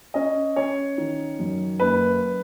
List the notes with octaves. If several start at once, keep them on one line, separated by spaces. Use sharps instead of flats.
C#4 D#5
C#4 C#5
D#3
F#2
F#1 B4